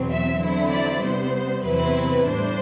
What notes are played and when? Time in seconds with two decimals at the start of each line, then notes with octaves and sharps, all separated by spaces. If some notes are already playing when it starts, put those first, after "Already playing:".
Already playing: E2 B2 F#3 C4
0.09 E5
0.41 D3 F#3 C4 E4
0.71 D5
1.02 C3 G3 B3 C5
1.64 E2 C3 F#3 C4 E4 B4
2.27 A2 G3 D4 C5